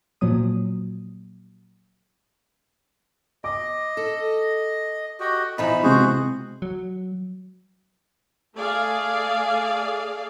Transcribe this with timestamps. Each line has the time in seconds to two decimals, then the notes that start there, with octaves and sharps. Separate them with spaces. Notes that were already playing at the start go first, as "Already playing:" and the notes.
0.21 A#2 F3 F#3 D#6
3.44 D#5 D6
3.97 A4
5.20 F#4 G4 D#5
5.58 B2 E3 F3 D#4 B5
5.83 C3 G#3 F#4 G#4 C5
6.62 F#3
8.55 A3 G#4 D5 F5